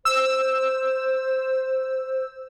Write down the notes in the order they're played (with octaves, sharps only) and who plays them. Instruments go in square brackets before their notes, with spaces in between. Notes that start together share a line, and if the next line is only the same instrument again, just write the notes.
[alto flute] C5 [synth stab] E6